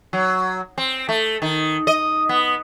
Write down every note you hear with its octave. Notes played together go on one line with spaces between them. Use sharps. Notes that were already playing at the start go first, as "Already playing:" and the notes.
F#3
C4
A3
D#3
D#5
B3